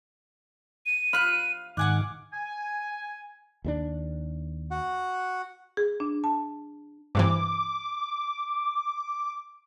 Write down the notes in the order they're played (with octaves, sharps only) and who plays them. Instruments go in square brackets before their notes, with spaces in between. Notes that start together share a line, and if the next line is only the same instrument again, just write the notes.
[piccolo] D#7
[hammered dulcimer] F5 [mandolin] B5 F#6
[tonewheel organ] G#2 D#3 [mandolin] F#5 G#5 F#6 [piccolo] D6
[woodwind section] G#5
[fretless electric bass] D#2 G3 D4
[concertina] F#4 F#5
[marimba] G#4
D4
A5
[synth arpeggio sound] G2 C3 E3 [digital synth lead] D6